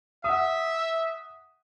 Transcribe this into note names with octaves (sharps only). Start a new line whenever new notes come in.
E5 F#5 D#6